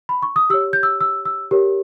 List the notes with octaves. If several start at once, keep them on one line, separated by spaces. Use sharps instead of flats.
B5
C#6
D#6
G4 C#5 E6
G6
E6
E6
E6
G4 A#4 C#5